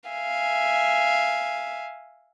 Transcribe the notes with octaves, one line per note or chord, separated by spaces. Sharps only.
E5 F5 G#5